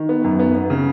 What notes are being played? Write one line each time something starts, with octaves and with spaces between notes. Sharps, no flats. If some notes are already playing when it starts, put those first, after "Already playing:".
Already playing: D#3
B3
F#2
B3
B3
C#3